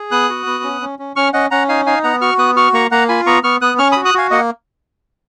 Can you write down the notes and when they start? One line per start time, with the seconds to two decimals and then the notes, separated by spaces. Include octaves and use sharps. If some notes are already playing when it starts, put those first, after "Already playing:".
Already playing: G#4
0.11 B3 D#6 F#6
0.29 F#4
0.46 B3
0.64 C#4
0.81 C#4
0.99 C#4
1.16 C#4 C#6 F6
1.33 C#4 D#5 F#5
1.51 C#4 F#5 A#5
1.69 D#4 F5 G#5
1.86 D#4 F5 G#5
2.03 B3 F#5 A#5
2.21 F#4 C#6 F6
2.38 B3 D#6 F#6
2.56 F#4 C#6 F6
2.73 A#3 A#5 C#6
2.91 A#3 F#5 A#5
3.09 F4 G#5 B5
3.26 B3 A#5 C#6
3.44 B3 C#6 F6
3.61 B3 D#6 F#6
3.78 C#4 C#6 F6
3.92 B5 D#6
3.97 F#4
4.05 D#6 F#6
4.14 F#4 F5 G#5
4.31 A#3 D#5 F#5